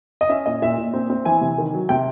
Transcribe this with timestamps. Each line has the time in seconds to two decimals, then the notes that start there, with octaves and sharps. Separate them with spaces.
0.21 D#5
0.29 C#4 E5
0.46 A#2 D#5
0.62 A#2 E5
0.78 A#2
0.93 C4
1.10 C4
1.25 E3 G#5
1.41 C3
1.58 D#3
1.74 F#3
1.89 C3 G5